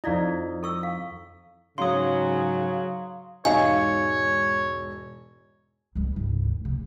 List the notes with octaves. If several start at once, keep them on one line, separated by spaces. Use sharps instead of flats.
F2 D#4 E4 D5 F5
A4 C#6 E6
F5
G#2 C#3 F#3 F5 C6 D#6
E1 G#2 D#4 C#5 F5 G#5
C#2 G3
C2 G2
D2
C#3